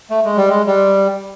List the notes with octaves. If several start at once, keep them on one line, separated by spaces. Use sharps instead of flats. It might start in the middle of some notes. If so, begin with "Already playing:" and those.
A3
G#3
G3
G#3
G3